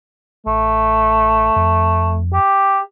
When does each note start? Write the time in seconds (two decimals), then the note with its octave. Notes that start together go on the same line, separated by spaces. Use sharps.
0.46 A1 A3
1.56 F2
2.33 G4